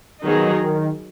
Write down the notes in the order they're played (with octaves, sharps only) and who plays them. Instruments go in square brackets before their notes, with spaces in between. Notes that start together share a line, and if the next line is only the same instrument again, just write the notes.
[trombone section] B2 [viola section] D#3 F#3 D#4 G#4
[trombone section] D#3